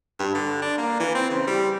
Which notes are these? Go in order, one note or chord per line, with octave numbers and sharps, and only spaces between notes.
G2
D3
D4
A#3
E3
C4
C#3
G3